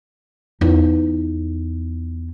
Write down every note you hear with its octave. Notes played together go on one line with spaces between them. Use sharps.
E2 D#4